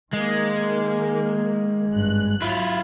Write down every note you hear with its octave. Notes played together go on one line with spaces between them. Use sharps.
D#3 G#3 A#3
G#1 G2 F#6
F#3 E4 F4